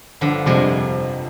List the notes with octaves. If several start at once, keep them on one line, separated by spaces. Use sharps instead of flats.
G1 D3 F3
F2 C3 F3 G3 G#3 C4